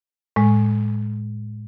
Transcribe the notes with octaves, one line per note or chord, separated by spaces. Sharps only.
A2 G#3